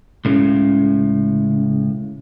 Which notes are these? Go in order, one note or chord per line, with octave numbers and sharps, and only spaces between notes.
C#2 A2 C#3